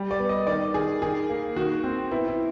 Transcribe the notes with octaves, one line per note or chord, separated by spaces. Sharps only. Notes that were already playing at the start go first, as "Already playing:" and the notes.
Already playing: G3
D5
B3
D#5
D#3 D5
D#3 G#4
D#3 G#4
A#3
D#3 F#4
C4
B3 E4
E4